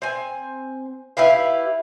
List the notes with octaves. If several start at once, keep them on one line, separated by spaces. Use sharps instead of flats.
C4 G#5
E4 G4 B4 F5